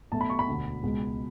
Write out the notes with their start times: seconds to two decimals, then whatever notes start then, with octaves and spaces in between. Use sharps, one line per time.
0.12 B1 B2 A3 A5
0.21 B5
0.30 C#6
0.39 B5
0.48 E1 D2 D3
0.83 C#2 B2 G#3